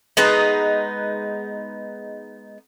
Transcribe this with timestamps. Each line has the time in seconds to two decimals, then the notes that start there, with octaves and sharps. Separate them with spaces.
0.17 G#3 B3 D#4 B4